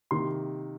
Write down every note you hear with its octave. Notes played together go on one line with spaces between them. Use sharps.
C3 D#3 A#3 C6